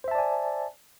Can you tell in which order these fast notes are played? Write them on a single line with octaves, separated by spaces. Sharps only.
C5 E5 A5 D5 G#5